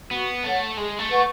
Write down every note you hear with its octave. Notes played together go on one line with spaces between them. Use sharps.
B3 F#4
A3 A4 C#5 F#5
G#3 G#4
A3
B4 F#5 C#6